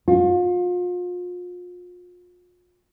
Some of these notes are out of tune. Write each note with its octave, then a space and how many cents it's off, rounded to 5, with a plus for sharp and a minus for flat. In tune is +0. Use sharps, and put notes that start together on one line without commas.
F4 +35